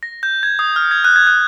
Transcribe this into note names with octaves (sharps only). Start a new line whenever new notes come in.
A#6
G6
G#6
D#6
F6
G#6
F#6
G#6
F#6